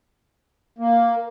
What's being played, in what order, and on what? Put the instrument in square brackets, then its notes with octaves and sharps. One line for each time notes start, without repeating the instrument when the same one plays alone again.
[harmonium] A#3